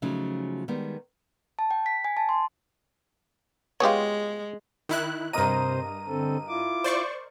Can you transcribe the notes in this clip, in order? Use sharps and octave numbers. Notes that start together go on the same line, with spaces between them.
C#3 F3 F#3 A3 C#4 D#4
D#3 G3 G#3 B3
A5
G5
B6
G#5
A5
C6
G#3 B3 F4 G4 G#4 C#5
D#3 E4 F#6
G2 C3 A#4 C5 D#5 A#5 D#7
D3 C4 A4
E4 F4 D6
C5 D5 C#6